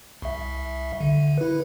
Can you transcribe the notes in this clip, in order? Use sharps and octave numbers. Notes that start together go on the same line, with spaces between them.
C2 E5
D3
E4 B4